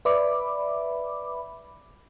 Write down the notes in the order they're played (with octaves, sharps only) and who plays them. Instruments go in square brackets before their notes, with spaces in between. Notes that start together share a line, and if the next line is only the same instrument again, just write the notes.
[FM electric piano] B4 D5 E5 B5 D6